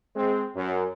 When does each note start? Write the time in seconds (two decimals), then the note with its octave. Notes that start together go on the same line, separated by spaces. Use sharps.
0.15 G#3 C4
0.56 F#2